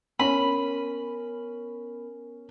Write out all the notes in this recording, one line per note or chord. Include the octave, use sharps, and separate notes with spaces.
B3 C#4 A#4 B5